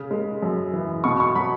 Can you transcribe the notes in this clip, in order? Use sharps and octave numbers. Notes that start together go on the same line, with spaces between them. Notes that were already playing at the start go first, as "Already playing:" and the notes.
Already playing: C#3
G#3
F#2
E3
B2 C#6
C#6
F#3 B5